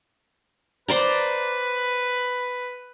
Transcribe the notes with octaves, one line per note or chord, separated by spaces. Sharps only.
B4 C5 D5 A#5